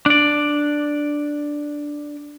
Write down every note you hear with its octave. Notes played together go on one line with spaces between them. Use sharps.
D4 D5